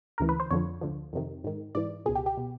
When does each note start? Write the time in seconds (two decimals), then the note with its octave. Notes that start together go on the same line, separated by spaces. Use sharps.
0.18 D2 C#3 E3 A#4
0.29 B4
0.40 C5
0.51 F2 D3 F3 C#5
0.81 D2 D3 F3
1.13 F2 C3 D#3
1.44 G#2 D#3
1.75 G#2 E3 D5
2.06 C#2 B2 G#4
2.15 G4
2.26 G4
2.37 B2